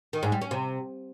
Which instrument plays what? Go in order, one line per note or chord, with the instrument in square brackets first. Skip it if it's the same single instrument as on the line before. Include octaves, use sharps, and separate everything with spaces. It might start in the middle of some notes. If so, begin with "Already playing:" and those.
[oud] D#3
G#2
G3
C#4
C3